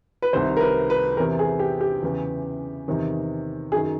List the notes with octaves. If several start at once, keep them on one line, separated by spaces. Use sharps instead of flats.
B4
C2 C3 D#3 C5
A#4
B4
B4
E2 C3 E3 A#4
G#4
G4
G4
E2 C#3 E3
E2 C3 D#3
F#2 D#3 G#4